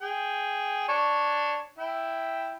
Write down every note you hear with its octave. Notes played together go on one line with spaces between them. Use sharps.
G#4 G5
D4 C#5
E4 E5 G5